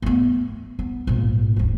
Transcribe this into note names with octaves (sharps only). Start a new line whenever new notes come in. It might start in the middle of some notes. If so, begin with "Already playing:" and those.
A3 B3
B3
A#1 G#2
D#1 D2